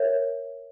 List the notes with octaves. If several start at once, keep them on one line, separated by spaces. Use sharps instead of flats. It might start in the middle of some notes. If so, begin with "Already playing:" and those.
Already playing: A#4 C#5 E5